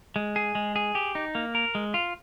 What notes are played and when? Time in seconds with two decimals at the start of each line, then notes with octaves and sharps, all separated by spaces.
0.16 G#3
0.36 G#4
0.55 G#3
0.76 G#4
0.95 G4
1.15 D#4
1.35 A#3
1.55 A#4
1.75 G#3
1.94 F4